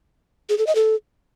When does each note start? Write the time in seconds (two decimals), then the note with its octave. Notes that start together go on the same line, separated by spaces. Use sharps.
0.49 G#4
0.58 A4
0.67 D#5
0.75 A4